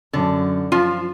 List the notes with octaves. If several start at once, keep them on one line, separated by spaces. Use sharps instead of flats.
F#2 D3
F3 F4